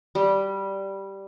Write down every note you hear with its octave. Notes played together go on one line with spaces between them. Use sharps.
G3